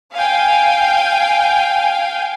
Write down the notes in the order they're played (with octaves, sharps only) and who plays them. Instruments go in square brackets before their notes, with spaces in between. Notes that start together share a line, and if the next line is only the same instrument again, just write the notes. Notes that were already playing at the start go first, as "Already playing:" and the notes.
[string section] F5 G5 G#5